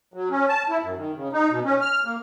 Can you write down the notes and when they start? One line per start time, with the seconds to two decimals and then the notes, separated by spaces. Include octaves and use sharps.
0.14 F#3
0.30 C#4
0.48 A5
0.69 E4
0.83 F#2
0.97 D#3
1.15 C#3
1.33 D#4
1.50 B2
1.65 C#4
1.81 F6
2.05 A#3